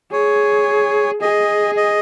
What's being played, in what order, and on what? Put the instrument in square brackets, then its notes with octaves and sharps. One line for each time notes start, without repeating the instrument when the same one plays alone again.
[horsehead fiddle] G#4 [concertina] C#5
[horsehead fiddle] G#4 [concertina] D#5
[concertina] D#5